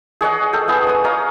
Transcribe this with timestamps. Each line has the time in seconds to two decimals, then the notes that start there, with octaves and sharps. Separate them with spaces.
0.21 G#4 C#5 D#5 F#5
0.53 A4 G5
0.68 B3 G#4 B4
0.87 C#5 D#6
1.04 C#5 D#5 F5 A#5